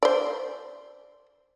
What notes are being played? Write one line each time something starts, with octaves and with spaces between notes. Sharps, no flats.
C5 D5